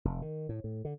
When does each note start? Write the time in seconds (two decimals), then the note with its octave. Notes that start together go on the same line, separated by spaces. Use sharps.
0.05 F1
0.22 D#3
0.49 A2
0.64 A2
0.85 D3